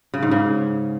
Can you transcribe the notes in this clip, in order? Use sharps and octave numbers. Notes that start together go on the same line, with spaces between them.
C#3
G#2
C#3